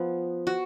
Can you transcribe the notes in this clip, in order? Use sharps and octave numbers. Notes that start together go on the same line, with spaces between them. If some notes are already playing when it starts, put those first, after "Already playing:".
Already playing: F3 B3
F#4